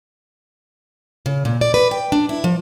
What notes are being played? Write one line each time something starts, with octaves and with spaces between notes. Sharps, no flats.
C#3
A#2
D5
B4
G5
D4
E4
F3